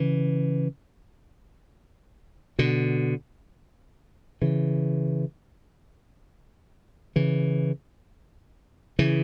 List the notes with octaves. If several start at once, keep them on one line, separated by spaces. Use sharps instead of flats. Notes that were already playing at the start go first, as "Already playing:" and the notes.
Already playing: C#3 E3
B2 D3
C#3 E3
C#3 E3
C#3 E3